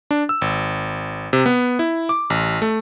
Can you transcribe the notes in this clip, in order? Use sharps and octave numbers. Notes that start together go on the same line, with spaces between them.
D4
E6
G#1
C3
B3
E4
D6
A1
A3